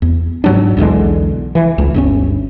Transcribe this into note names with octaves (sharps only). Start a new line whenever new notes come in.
E2
G#2 F#3 D4
B1 E2 D3 G#3
E3
C#2
G1 D2 C#4